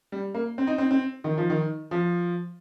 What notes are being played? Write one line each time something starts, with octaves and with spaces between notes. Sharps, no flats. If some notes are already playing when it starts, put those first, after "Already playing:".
G3
A#3
C4
D#4
C4
C4
D#3
F3
D#3
F3